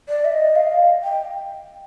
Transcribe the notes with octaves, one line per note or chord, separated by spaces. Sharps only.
D5
E5
D#5
F5
G5